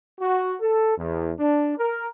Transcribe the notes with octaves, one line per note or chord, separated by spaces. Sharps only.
F#4
A4
E2
D4
A#4